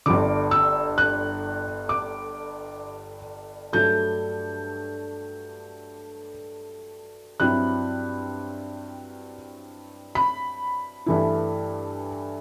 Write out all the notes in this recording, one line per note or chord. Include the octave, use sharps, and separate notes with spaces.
G1 G2 D3 D6
E6
F#6
D6
G2 F#3 A3 G6
G2 F#3 C4 E4 F#6
B5
G2 E3 A3 E4